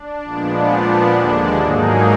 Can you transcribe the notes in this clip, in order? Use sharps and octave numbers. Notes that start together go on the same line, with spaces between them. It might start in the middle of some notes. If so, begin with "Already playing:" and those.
Already playing: D4
A#2 F3 G#3 B3 D4
A#2 F3 B3 D4
D#2 D3 G#3 D4
G#2 F#3 A#3 D#4 G#4